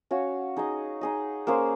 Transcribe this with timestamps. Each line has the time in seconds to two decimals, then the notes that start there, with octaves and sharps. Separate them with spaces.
0.11 C#4 F#4 C#5 F5
0.57 D#4 G#4 D#5
1.01 D#4 G#4 D#5
1.47 A#3 C#4 G#4 C5